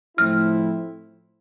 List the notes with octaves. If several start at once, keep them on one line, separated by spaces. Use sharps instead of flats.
A2 F3 A3 C4 E4 F6